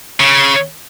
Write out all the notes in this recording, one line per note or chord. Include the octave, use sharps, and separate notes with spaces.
C#3